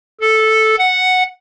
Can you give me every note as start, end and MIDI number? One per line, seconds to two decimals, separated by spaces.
0.21 0.75 69
0.78 1.23 78